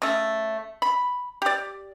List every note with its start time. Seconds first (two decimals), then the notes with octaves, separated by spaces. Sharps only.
0.02 C#3 A3
0.82 B5
1.42 G4 D5